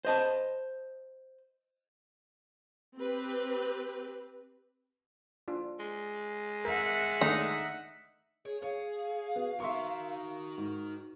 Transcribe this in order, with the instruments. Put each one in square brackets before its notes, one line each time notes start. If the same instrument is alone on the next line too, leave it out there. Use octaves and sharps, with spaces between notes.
[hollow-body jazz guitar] C5 D#5 A5
[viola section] C4 G4 B4
[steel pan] D4 F4
[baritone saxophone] G#3
[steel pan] A#4 [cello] E5 F#5
[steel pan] D#3 A3 D4 [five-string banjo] D#4
[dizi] G#4 [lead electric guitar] C#5
[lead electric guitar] G#4 [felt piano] C#5 [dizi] F5
[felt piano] B3 [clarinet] F#4
[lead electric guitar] D#4 A#4 [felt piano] E5 C6 C#6
[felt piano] G#2